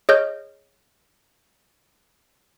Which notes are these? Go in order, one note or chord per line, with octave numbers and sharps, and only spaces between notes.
G#4 C#5 D#5 F6 G6